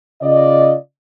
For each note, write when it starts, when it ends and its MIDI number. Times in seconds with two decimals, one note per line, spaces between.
0.21 0.73 49
0.21 0.73 65
0.21 0.73 74
0.21 0.73 75